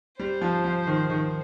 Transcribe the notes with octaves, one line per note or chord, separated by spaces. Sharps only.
G3 C5
F3
F3
D#3
D#3